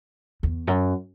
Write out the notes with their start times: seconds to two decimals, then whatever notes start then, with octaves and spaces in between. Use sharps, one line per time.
0.43 E2
0.67 F#2